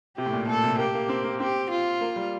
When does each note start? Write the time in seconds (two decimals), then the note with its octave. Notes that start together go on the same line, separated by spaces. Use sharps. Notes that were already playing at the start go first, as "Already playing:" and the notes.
0.17 C3 G4
0.26 A2
0.33 A#2
0.48 A#2 A4
0.64 C3
0.79 A#3 G4
0.95 A#3
1.09 C4
1.24 A#3
1.40 C4 G4
1.71 F4
2.01 A#3
2.16 G3